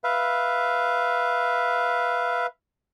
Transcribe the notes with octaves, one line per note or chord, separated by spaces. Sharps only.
B4 E5 F5